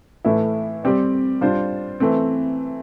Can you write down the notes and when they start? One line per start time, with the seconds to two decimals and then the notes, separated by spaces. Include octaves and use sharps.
0.25 A2 E3 A3 E4
0.84 G3 C4 G4 D5
1.41 G3 D4 F4 C5
2.00 E3 A3 C4